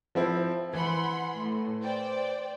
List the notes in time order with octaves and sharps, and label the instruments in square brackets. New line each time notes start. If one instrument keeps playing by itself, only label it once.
[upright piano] F3 C4 E4
[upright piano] E3 [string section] F#5 B5 C6
[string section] A2
C5 D5 G5